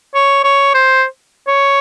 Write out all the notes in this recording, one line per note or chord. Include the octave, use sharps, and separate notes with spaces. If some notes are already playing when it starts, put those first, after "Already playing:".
C#5
C#5
C5
C#5